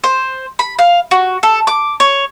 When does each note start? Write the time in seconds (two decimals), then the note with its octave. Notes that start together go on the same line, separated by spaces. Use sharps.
0.04 C5
0.59 B5
0.79 F5
1.11 F#4
1.43 A4
1.67 D6
2.00 C#5